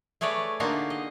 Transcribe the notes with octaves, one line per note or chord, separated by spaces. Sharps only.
A3 G#4 B4 C#5 D5
D3 A#3 D4 D#4 F4 F#4
D#5